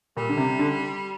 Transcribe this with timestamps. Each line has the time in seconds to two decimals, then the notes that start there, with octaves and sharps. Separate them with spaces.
0.17 A#2 G3
0.29 D3
0.37 C3
0.59 D3